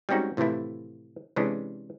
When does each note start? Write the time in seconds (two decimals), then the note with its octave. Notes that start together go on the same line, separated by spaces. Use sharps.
0.09 G3 G#3 C4 C#4 D#4 F#4
0.37 A2 C3 E3 F3 A3 E4
1.36 C3 E3 G#3 C#4 D4 E4